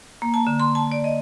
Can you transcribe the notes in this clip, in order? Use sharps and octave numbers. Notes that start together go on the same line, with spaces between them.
A#3
A5
D3
C6
A5
D5
D#5